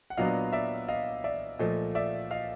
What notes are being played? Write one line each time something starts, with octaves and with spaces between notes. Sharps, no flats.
F#5
A#2 F#3 B3 D4 D#5 F5
D5 E5
D#5 F5
D5 E5
A#2 F3 A3 D#5
D5 E5
D#5 F5